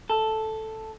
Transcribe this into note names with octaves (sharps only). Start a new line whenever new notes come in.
A4